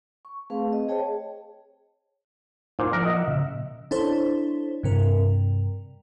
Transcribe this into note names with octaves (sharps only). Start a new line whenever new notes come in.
C#6
A3 C4 G#4 B4 F5
D#5
G#4 C5 C#5 D#5 G5 A5
A#2 D#4 E4 C5
F3 A#4 E5 F#5
D#5
A#2 C#3 E5
D4 E4 A4 C5 C#5
G2 C3 A#4